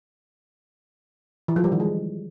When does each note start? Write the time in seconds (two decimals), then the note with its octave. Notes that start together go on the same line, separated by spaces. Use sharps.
1.48 E3
1.56 F3
1.64 G3
1.72 D#3
1.80 G#3